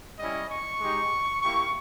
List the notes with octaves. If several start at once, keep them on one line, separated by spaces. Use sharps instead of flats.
G3 C#4 E4 D#5
C#6
G#3 D#4 G4
A#3 E4 G4 C#6